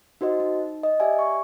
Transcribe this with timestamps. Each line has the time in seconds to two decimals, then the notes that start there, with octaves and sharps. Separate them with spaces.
0.21 D#4 F#4 C5 D#5
0.40 D#4
0.83 D#5
1.00 G4 D5 E5 G#5
1.19 C#6